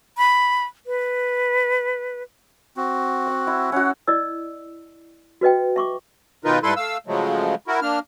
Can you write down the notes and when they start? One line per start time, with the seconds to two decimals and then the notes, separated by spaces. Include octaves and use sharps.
0.18 B5
0.86 B4
2.77 C4 F#4
3.27 F#5
3.47 E4
3.72 C#4 F#4 F#5
4.07 E4 D5 D#5 E6
5.41 F#4 B4 D#5 G5
5.76 E5 C#6 D6
6.45 B2 D#3 D#4 F4 A#4 B4
6.63 G#2 G3 E4 A4 B4 C6
6.77 A3 F5 E6
7.07 C#3 F3 F#3 G#3 A3
7.68 E4 F#4 A#4
7.82 A#3 D4 F6